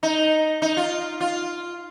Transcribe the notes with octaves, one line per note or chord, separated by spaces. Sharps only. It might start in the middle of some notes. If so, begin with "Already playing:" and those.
D#4
D#4
F4
F4